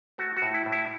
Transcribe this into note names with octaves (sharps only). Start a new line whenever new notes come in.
A3 F#4
F#4
A2
E4
A2
E4